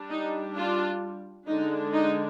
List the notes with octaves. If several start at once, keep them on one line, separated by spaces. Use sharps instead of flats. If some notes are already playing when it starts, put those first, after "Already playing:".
Already playing: G3 D4
D#4
D4 F4
D3 G#3 D4 D#4
D#4